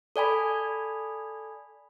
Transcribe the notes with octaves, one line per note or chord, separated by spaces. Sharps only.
A4 D5 G#5 B5